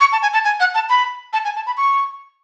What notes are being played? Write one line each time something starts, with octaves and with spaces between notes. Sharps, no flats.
C#6
A5
G#5
A5
G#5
F#5
A5
B5
A5
G#5
A5
B5
C#6